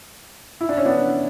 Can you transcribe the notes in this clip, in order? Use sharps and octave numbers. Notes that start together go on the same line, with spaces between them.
E4
D4
C#4
B3 D4